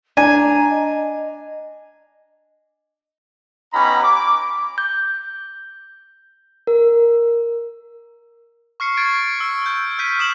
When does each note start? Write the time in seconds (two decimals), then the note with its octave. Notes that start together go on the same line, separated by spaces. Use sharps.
0.17 D4 G#5 A#5
0.70 D#5
3.74 B3 C#4 D#4 G4 A#5 B5
4.03 D6
4.78 G6
6.67 A#4
8.80 C#6 F6 C7 C#7
8.97 C#6 G#6 A6 D7
9.40 E6
9.62 E6 G6
9.99 F6 G6 B6 D#7
10.19 D#6 E7 F#7